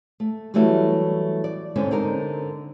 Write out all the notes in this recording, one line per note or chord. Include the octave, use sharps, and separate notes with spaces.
A3
E3 F#3 G3 A3 E4 F#4
D5
G#2 D3 C4 C#4
D3 C4 D#4 A#4